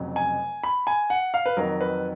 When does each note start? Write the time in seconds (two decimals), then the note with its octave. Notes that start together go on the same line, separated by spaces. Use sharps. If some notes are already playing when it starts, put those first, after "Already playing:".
Already playing: F1 F2 C#3 F#3
0.16 G#5
0.64 B5
0.87 G#5
1.10 F#5
1.34 F5
1.46 B4
1.57 F2 D#3 F#3 A#4
1.81 B4